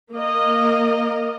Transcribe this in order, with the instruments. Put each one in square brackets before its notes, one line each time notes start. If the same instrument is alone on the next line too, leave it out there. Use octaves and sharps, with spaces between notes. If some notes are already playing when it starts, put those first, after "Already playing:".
[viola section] A#3 A#4 D#5